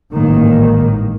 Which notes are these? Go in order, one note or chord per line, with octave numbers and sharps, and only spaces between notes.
A1 G#2 D#3 A#3